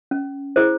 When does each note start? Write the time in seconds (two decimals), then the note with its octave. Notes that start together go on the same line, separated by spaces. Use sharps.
0.11 C#4
0.56 E4 G#4 C5